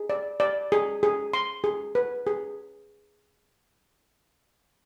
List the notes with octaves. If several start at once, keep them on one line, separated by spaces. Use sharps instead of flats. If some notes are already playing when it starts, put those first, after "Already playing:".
Already playing: G#4
D5
D5
G#4
G#4
C6
G#4
B4
G#4